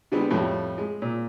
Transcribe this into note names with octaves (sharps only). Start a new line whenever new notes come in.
D3 G3 G#3 B3 C4
F2 A2 G3
G#3
A#2